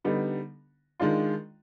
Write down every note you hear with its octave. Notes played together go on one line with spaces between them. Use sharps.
D3 G3 B3 D#4
D#3 G#3 D4 F4